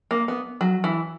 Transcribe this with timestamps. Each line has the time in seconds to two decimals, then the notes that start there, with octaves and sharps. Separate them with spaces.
0.11 A#3
0.28 B3
0.61 F#3
0.84 E3